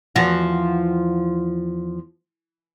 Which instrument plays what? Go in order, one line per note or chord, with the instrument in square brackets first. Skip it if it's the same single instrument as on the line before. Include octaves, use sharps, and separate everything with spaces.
[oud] E2 F3 F#4